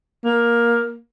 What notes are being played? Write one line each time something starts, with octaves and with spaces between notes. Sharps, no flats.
A#3